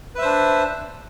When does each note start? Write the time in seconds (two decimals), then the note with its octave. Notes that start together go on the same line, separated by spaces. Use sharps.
0.15 B4
0.18 E5
0.22 C5
0.25 D4